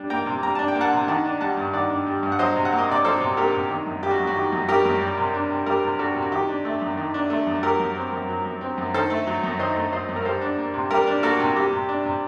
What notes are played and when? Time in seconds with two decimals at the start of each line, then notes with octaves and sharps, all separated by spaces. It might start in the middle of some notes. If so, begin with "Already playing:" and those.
Already playing: G3 D4
0.10 A#3 G5 A#5
0.26 C3
0.42 G3 A#5
0.55 D4 A5
0.68 G5
0.75 A#3
0.81 F#5 A5
0.92 C3
1.08 D#3 F#5 A5
1.25 D4
1.41 G3 F#5 A5
1.57 G2
1.73 D#3 D5 F#5
1.90 D4
2.06 G3
2.23 G2
2.32 F#5
2.39 F#3 C5 D#5
2.56 C3
2.65 F#5
2.72 A#3
2.78 D#5
2.88 C3 D5
3.05 F#3 A4 C5
3.21 C3
3.37 A#3 G4 A#4
3.54 C3
3.70 D#3
3.86 F#2
4.03 G3 G4
4.11 F#4
4.19 F#2
4.27 F#4
4.36 D#3 G4
4.52 F#2
4.69 G3 G4 A#4
4.85 F#2
5.01 G3
5.17 C3
5.34 D4
5.50 C3
5.66 G3 G4 A#4
5.83 C3
5.99 D4 F#4 A4
6.16 C3
6.22 F#4
6.32 D#3 G4
6.48 D4
6.65 A3
6.82 F#2
6.97 D#3
7.14 D4
7.30 A3
7.47 F#2
7.63 F#3 G4 A#4
7.79 F#2
7.96 C4
8.12 F#2
8.29 F#3
8.45 F#2
8.61 C4
8.78 F#2
8.94 D#3 A4 C5
9.10 A3
9.27 F#3
9.43 F#2
9.59 D#3 C5 D#5
9.76 A3
9.92 F#3 C5 D#5
10.08 F#2
10.16 A#4
10.25 G3 A4 C5
10.41 D4
10.57 A#3
10.74 C3
10.90 G3 G4 A#4
11.07 D4
11.23 A#3 F#4 A4
11.40 C3
11.56 G3 G4
11.73 C3
11.89 D4
12.05 C3